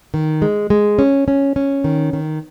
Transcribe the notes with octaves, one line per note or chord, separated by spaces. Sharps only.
D#3
G#3
G#3
C#4
C#4
C#4
D#3
D#3